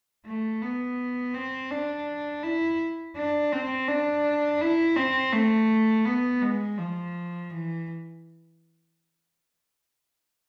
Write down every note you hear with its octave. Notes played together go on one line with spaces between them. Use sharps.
A3
B3
C4
D4
E4
D4
C4
D4
E4
C4
A3
B3
G#3
F3
E3